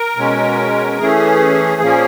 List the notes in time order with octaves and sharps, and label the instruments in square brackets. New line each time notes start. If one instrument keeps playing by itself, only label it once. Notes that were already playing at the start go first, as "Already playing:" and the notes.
Already playing: [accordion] A#4
B2 G#3 C#4
E3 A3 C#4 G#4
A#2 F3 A#3 C#4